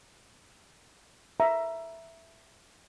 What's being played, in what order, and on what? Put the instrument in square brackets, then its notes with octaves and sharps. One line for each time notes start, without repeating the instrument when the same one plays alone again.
[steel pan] E5 A#5